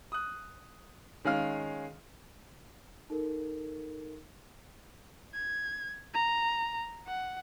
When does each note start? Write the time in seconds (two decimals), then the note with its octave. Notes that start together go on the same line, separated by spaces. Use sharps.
0.12 D#6 F#6
1.25 D#3 G#3 C#4 F5 F6
3.10 D#4 A4 A#4
5.34 G#6
6.13 A#5
7.07 F#5